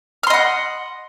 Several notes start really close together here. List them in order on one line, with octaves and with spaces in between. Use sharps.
F6 C6 D#5 F#5